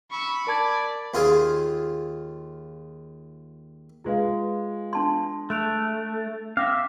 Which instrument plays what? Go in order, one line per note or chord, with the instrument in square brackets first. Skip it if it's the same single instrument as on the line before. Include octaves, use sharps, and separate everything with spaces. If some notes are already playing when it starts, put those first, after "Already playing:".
[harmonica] B5 [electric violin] C#6 E6
[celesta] A#4 A5 G#6 [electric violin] D5
[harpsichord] D#2 F4 G#4
[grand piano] G#3 G#4 [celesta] F4 B4 F5
[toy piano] D4 A5 C6
[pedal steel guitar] A3 [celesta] F#6 D7 F7
[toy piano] C#4 [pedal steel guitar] E5 F5 [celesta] D6 A#6